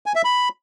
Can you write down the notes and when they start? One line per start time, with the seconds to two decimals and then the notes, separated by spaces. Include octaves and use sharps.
0.06 G#5
0.15 E5
0.24 B5